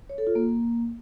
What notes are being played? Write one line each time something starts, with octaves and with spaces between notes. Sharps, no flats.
C#5
A4
F4
A#3